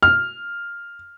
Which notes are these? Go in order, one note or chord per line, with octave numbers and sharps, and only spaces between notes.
F6